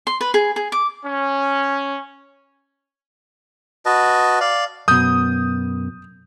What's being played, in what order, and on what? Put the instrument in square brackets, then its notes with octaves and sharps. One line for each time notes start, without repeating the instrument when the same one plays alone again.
[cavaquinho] C6
B4
G#4
G#4
D6
[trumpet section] C#4
[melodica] F#4 B4 D#5 A5
D5 F5
[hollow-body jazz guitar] F#2 B2 [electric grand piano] D#6 G6